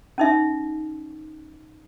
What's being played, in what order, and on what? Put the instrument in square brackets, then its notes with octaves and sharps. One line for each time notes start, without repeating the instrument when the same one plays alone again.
[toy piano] C#4 D#4 E5